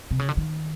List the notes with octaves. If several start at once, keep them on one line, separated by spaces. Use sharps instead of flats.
C3
C#3
D3
D#3